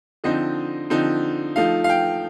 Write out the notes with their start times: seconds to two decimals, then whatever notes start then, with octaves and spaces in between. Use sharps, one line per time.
0.24 D3 F3 C4 D#4 D#5
0.90 D3 F3 C4 D#4
1.56 F3 A3 D#4 F5
1.84 F5
1.89 G5